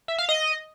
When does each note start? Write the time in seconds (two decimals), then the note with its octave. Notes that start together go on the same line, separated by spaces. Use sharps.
0.08 E5
0.18 F5
0.29 D#5